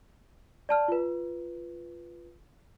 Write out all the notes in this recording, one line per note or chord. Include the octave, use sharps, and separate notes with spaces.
D5 A5 F6
F4 B4